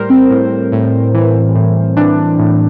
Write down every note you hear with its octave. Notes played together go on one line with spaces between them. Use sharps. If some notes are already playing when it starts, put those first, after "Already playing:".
Already playing: A2 G3 A#4 C5
C4
A2
A2
E3
A2
E3 D4
A2